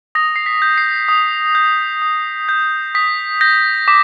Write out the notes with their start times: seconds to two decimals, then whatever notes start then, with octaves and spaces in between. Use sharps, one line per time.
0.15 D#6 A#6
0.36 C7
0.46 B6
0.62 G6
0.78 C7
1.08 D#6
1.55 G6
2.02 D#6
2.49 G6
2.95 D#6 B6
3.41 G6 A#6
3.88 D6 B6